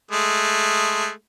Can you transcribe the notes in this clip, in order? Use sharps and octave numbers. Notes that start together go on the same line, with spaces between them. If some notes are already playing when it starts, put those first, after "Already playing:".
G#3 A3